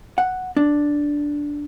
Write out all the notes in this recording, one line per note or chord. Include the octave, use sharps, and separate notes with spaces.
F#5
D4